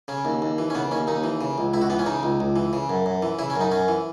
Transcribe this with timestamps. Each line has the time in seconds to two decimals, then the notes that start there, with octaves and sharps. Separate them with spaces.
0.08 C#3 C#4
0.25 D#2
0.42 D#2
0.58 E3
0.70 C#4
0.75 C#3 B3
0.91 D#2 C#4
1.07 D#2 D#4
1.24 E3
1.41 C#3
1.58 C#2
1.74 C#2 E4
1.81 F#4
1.90 E3 B3
1.99 C#4
2.06 C#3 D#4
2.23 C#2
2.40 C#2
2.56 E3
2.73 C#3
2.90 F#2
3.06 F#2
3.22 E3
3.39 C#3 E4
3.50 C#4
3.56 F#2
3.61 D#4
3.71 F#2 C#4
3.88 E3